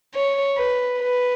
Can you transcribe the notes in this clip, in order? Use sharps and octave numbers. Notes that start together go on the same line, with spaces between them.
C#5
B4
B4